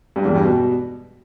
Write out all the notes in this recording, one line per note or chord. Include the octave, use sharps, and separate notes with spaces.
G2
E2
G2
B2